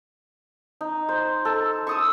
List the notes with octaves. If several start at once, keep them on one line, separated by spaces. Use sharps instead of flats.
D#4
C5
A4
C#6 D#6 E6